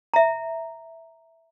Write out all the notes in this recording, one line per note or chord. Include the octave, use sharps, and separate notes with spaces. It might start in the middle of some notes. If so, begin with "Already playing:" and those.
E5 A#5